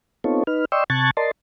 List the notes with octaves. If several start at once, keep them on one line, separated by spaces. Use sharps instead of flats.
B3 C4 D#4 F4 A4 C#5
D#4 B4 F6
D5 D#5 G5 C6 C#6 E6
C3 A5 C#6 F#6 G#6 A6
A#4 D5 D#5 A5 C6